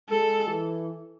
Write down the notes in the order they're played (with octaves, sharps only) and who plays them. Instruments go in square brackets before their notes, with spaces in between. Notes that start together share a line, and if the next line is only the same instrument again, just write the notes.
[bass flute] G#3 [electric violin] A4
[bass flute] E3